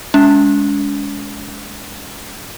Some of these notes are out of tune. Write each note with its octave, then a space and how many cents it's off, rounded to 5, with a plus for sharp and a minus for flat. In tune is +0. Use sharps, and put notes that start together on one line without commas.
G#3 +0 C#4 +45